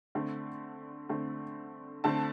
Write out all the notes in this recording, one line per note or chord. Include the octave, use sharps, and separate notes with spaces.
D3 A3 C4
D3 A3 C4
D3 A3 C4 A5